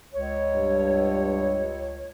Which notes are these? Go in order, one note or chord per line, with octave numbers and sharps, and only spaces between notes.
C#2 C#5
G2